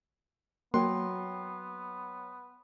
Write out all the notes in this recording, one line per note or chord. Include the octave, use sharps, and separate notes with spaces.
F#3 A#3 B3 C#5 G5 C6